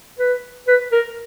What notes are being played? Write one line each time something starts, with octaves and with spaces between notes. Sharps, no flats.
B4
B4
A#4